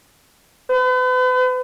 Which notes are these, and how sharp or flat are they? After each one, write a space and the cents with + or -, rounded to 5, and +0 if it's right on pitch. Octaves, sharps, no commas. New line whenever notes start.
B4 +40